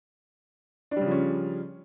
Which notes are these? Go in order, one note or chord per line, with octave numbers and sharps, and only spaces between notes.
C#3 F3 G3 C#4 D4